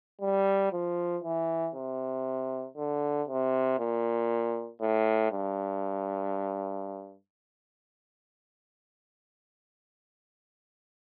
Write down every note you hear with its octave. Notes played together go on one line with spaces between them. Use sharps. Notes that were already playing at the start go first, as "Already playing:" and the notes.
G3
F3
E3
C3
D3
C3
A#2
A2
G2